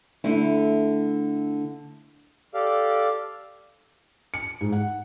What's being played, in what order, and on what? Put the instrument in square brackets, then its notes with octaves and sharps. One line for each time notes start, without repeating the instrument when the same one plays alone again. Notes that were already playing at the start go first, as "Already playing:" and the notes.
[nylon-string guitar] D3 A3 E4
[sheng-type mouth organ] G4 A4 D5 F5
[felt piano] C#7
G#2
F#5